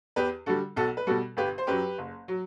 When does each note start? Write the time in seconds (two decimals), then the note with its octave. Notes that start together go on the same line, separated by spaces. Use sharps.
0.16 E2 G4 B4
0.46 D3 G3 F#4 A4
0.76 B1 F#4 A4
0.97 B4
1.07 B2 G3 F#4 A4
1.37 G1 G4 B4
1.58 C5
1.67 F#2 F#3 G4 B4
1.98 F#1
2.28 F#3